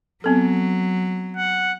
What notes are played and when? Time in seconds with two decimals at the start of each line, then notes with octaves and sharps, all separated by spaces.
0.24 F#3 B3 C4 A4
1.37 F#5